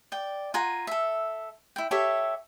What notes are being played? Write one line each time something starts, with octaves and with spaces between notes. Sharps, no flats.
D5 G5
F4 F#5 G#5 A#5
A4 E5
E4 G5
G4 A4 C#5 E5